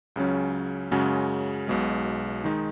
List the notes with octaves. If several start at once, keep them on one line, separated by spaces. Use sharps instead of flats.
C#2 C#3 F#3 C#4
F#2 C#3 G#3 C#4 F#4
B1 B2 G#3
D#3 G#3 D#4